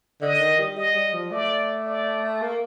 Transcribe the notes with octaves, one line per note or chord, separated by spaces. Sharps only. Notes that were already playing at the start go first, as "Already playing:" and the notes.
D3 D#5
D#3
G3
G3 D#5
G3
F3
A3 D5
D5
A#3